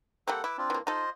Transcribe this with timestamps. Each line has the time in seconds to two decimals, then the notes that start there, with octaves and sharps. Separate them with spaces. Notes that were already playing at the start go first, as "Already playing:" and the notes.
0.28 G3 A#3 C4 A4 F#5
0.44 E4 B4 D6 E6
0.58 C4 D4 F4
0.70 E3 A#3
0.87 D#4 F4 A4 C5 D#5